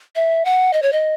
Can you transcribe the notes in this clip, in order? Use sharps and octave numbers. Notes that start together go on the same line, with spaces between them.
E5
F#5
D#5
C#5
D#5